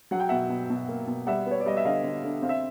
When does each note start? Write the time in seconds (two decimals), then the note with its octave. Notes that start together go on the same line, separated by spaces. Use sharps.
0.11 F#3 F#5
0.20 G5
0.29 B2 E5 F#5
0.50 B2
0.70 B2
0.88 A#3
1.07 B2
1.27 G3 E5 F#5
1.46 B3 C#5
1.60 D5
1.66 G3 D#5
1.77 E5
1.85 D3 D#5 F5
2.04 D3
2.24 D3
2.42 C4 F5
2.49 E5